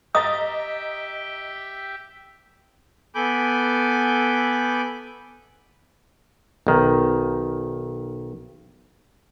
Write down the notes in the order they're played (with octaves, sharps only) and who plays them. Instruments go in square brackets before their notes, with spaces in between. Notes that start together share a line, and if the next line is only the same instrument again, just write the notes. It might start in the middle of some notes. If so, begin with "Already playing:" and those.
[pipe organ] G4 E5 G5 [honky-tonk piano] D#5 A#5 A6 [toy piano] D#6
[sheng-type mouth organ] B3 A4 G#5 B5 D6 G6
[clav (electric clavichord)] B1 D#3